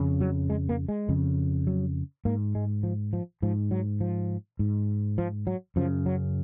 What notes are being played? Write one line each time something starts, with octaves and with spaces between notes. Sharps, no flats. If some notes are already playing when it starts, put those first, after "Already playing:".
Already playing: F2 C#3
F#3
G#3
A#3
G#3
F2 C#3
F#3
G#2 A#3
G#3
F3
F3
G#2 F3
F#3
F3
G#2
F3
F#3
F#2 C#3 F3
F#3